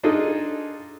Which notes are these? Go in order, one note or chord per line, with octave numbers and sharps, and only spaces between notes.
D4 D#4 F4 G#4 A4 D#5